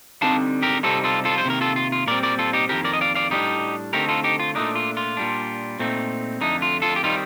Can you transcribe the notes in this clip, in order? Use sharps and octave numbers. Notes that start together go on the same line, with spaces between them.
D3 G3 C4 D#4 F5 A5
G4 A#4
C3 G3 C4 D#4 F4 A4
F4 A4
F4 A4
C5
C3 D#3 A#3 A#4
F4 A4
F4
F4
A#2 G3 C4 A#4 D5
A#4 D5
F4 A4
D#4 G4
F2 D#3 A#3 G4 A#4
A#4 D5
D#5
D5 F5
D5 F5
A2 G3 D4 D#4 G4
D3 A3 C4 D#4 G4 A#4
F4 A4
D#4 G4
F4
A#2 A3 D4 D#4
F4
F4
A#2 G3 D4
A#2 A3 C4 D#4
F2 D3 A3 D#4
F4
F4 A4
G4
D#3 G3 C4 D#4 F4